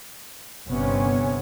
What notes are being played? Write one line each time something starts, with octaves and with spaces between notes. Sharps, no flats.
G1 C3 B3 C#4